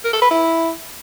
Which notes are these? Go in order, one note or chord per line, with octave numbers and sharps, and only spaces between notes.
A#4
A4
B4
E4